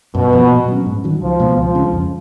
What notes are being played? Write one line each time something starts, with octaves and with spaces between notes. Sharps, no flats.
F#2 B2
F3 B3
A#2
F#3 C#4
G#2
D#3 F#3
C#2 F3
B2 G#3 B3
C#2 F3
C#3 G#3 C#4
F2